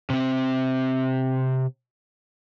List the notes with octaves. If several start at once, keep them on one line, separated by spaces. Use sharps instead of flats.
C3 C4